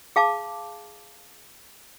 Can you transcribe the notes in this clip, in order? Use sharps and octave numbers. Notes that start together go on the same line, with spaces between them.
G#4 F5 A5 D6